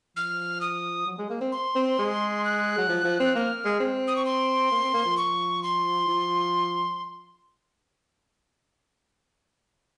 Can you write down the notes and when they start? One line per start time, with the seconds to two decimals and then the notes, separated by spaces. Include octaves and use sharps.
0.16 F3 F6
0.61 D#6
1.07 F#3
1.18 G#3
1.29 A#3
1.41 C4
1.52 C6
1.75 C4
1.99 G#3
2.44 F#6
2.78 F#3
2.89 F3
3.04 F3
3.20 C4
3.35 A#3 F#6
3.40 F6
3.65 G#3
3.80 C4
4.07 D#6
4.16 C#6
4.25 C6
4.71 A#3
4.83 C4
4.94 A#3
5.05 F3
5.17 C#6
5.63 C6
6.08 F3